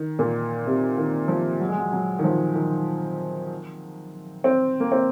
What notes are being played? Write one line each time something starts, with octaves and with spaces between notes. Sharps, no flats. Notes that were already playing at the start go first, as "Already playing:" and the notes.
Already playing: D#3
A#2
C3
D#3
F3
F#3
G#3
F#3
F#3
D#3
F3
D#3
C4
A#3
C4